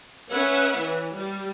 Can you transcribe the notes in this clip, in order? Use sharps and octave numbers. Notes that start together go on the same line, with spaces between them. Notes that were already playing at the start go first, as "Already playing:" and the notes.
C#4 B4 C#5 E5 F#5
E3
G3